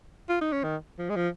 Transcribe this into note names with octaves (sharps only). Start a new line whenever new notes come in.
F4
D#4
C#4
D#3
F3
G#3
F3